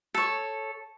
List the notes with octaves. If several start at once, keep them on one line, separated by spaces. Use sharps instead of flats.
A4 C#5